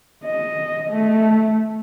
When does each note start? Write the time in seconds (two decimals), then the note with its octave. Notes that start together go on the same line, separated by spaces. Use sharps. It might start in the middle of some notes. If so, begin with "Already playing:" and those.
0.25 D#5
0.90 A3